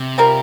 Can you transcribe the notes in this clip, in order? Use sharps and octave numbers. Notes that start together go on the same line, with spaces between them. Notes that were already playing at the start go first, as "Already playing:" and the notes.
Already playing: C3
G3 C4 F4 A#4